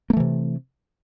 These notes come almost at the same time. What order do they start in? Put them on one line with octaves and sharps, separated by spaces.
A#3 A3 E3 C3